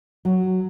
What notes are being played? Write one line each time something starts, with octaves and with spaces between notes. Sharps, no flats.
F#3